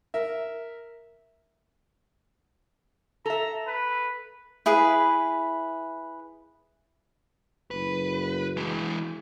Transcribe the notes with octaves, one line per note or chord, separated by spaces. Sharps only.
A#4 E5
A4 E5 A#5
B4
E4 G#4 B4
F#1 B4
E3 G#3